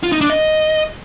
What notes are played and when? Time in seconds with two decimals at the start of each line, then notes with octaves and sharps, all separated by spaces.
0.03 F4
0.12 D#4
0.21 D4
0.30 D#5